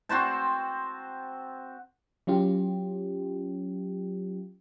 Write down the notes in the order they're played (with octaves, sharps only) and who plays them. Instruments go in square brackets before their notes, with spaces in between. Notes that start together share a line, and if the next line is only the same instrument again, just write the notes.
[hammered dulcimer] C4 F#4 C5 A5
[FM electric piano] F#3 C#4 F4 G4